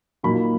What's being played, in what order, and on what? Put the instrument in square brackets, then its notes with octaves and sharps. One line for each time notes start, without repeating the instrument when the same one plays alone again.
[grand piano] A#2 F#3 A#3 D#4 B5